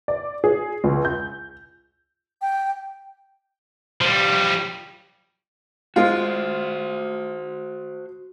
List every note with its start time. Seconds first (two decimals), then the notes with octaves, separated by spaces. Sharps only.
0.08 D5
0.44 G#4
0.84 C#2
1.05 G6
2.42 G5
4.01 F3 G3
5.96 G#3 F4 F#4 C5